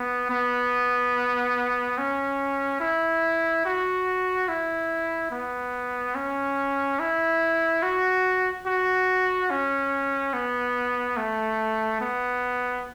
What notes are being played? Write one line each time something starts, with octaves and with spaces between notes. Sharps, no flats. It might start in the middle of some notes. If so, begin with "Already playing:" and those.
Already playing: B3
B3
C#4
E4
F#4
E4
B3
C#4
E4
F#4
F#4
C#4
B3
A3
B3